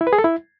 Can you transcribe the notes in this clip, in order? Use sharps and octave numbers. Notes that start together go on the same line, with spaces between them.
E4
B4
G#4
A4
E4